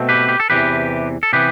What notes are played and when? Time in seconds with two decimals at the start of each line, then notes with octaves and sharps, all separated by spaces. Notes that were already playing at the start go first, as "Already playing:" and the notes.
Already playing: B2 A3 C4
0.09 G4 B4
0.29 G4
0.40 A4
0.50 E2 C3 E3 G4 B4
1.23 A4
1.33 C3 E3 B3 G4 B4